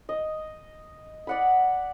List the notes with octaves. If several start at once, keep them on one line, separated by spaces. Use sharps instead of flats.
D#5
D5 F#5 B5